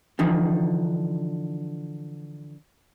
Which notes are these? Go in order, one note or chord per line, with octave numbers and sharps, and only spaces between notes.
D3 E3 F3 D#4